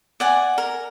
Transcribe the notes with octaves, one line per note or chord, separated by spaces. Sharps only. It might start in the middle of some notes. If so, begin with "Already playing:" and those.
D5 F#5 G#5
A#4